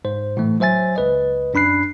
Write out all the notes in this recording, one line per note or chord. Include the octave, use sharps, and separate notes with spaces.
G#2 C5
A2 E3 A3
F#3 C5 E5 G#5 A6
C#2 B4 D#5
F#2 D4 B5 F#6 C7